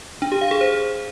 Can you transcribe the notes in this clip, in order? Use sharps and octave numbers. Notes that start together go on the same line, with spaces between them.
D4
G4
F5
G#4
C5